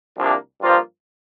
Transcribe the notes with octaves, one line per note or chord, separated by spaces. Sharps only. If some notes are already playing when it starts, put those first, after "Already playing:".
C2 C3 F3 A#3 D4
G2 F3 A#3 F4 C5